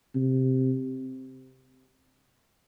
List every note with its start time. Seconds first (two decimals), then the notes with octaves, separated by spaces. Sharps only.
0.15 C3